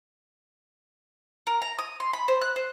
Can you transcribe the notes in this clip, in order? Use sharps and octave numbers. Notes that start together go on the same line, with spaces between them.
A#4
A#5
D#6
C6
B5
C5
F#6
C5